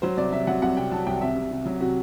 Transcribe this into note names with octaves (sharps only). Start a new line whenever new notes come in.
F#3 C5
C2 D5
C3 E5
F#3 F#5
C2 F#5
C3 G5
F#3 A5
C2 G5
C3 E5
C3
C3
F#3
C3 F#4